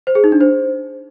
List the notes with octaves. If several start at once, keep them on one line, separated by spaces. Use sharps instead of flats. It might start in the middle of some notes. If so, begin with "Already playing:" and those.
C5
G#4
D#4
D4
C5